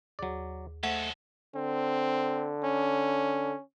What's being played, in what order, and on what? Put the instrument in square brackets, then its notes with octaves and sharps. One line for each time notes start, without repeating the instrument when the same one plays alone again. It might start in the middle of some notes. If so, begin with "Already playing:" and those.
[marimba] D#2 G#4 [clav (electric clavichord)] F#3 D5
[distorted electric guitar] G#3 A4 [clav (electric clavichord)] A3 [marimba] C5 [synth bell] F#5
[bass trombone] D3 [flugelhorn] C4
[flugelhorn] C#4